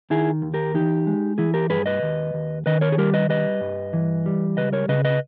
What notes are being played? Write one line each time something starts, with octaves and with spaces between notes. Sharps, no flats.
D#3 E4 G#4
D#2
G4 A#4
E3 D#4 G4
G#3
E3 E4 G#4
G4 A#4
G2 G#4 B4
B4 D#5
D#2
D#2
D#3 B4 D#5
A#4 C#5
G#4
G3 G4 A#4
B4 D#5
G3 B4 D#5
G2
E3
G3
C#2 B4 D#5
A#4 C#5
C#3 B4 D#5
B4 D#5